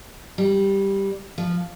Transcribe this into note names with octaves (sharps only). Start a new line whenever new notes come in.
G3
F3